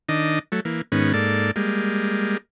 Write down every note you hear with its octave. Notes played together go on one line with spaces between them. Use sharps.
D#3 D4 D#5
F#3 A3
E3 A#3
G#2 D#3 B3 C#4
G#2 A#3 A4 D5
G3 G#3 A#3